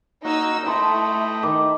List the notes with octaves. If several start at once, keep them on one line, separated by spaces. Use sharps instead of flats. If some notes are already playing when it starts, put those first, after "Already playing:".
A#3 D#4 F#4 E6
A3 E4 B4 D#5 G5 C6
D#3 D6